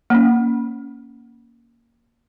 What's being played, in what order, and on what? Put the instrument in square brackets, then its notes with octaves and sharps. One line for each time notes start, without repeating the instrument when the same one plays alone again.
[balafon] A#3 C#4